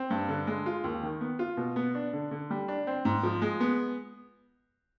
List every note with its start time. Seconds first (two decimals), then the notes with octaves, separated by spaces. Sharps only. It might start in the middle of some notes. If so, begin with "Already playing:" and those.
Already playing: C4
0.10 G2
0.29 D3
0.47 G#3
0.66 F4
0.84 D#2
1.03 D#3
1.21 B3
1.39 F4
1.57 B2
1.76 B3
1.95 D4
2.13 D3
2.31 D3
2.50 G3
2.68 D4
2.87 C4
3.05 G#2
3.23 F3
3.42 G#3
3.60 B3